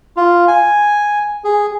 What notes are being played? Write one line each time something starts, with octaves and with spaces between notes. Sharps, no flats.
F4
G#5
G#4